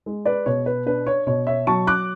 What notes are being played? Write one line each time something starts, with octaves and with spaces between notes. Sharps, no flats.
G#3
B4 D5
B2 C#5
B4
D4 B4
C#5
B2 C#5
C#5 E5
F#3 A5 C#6
D6 F#6